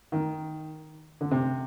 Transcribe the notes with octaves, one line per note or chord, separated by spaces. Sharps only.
D#3
D3
C3